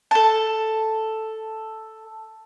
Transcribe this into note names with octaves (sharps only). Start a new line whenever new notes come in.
A4 A5